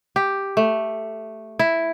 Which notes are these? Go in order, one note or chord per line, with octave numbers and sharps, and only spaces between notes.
G4
A3
E4